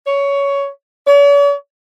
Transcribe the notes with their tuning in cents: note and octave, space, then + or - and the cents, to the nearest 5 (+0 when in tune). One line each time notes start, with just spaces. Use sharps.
C#5 +15
C#5 +45